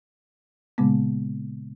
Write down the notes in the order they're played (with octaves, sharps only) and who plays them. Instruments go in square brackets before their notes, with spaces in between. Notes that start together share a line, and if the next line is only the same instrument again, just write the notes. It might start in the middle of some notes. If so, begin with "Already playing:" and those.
[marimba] A#2 C#3 G#3 A#3 B3